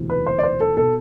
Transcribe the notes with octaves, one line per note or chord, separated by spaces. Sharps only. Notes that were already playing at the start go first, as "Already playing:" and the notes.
Already playing: E1 D2 C3 E3
B4
C5
D5
C5
A4
B2 A4